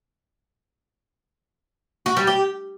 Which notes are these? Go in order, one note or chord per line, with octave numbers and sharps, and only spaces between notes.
F#4
G3
G4